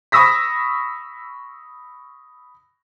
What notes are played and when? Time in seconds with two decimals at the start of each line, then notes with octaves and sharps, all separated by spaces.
0.12 B5 C#6 D#6 E6 A#6 B6